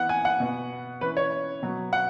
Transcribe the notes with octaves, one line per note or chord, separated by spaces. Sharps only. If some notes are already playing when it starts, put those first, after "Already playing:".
Already playing: E3 B3 F#5
G#5
F#5
B2 B3
E3 C#4 B4
C#5
B2 F#3 B3
F#5